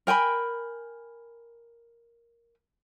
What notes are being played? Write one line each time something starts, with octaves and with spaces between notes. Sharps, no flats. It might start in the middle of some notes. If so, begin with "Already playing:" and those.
A#4 G5 G#5 B5